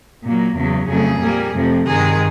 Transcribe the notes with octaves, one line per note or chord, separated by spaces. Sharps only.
A#2 F#3 A#3
E2 C#3 F#3
F2 C#3 F#3 A3 G#4
A#2 G3 A#3
F2 C3 F3 A3
G2 D#3 G#3 G#4